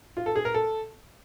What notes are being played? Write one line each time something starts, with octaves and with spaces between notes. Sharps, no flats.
F4
A4
G#4
A#4
A4